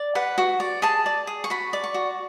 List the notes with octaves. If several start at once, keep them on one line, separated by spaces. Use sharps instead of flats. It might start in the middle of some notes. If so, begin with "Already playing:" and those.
Already playing: D5
B4 F#5
F#4
D5
G#4 A5
D5
G#4
C#6
F#4 B5
D5
C#6
F#4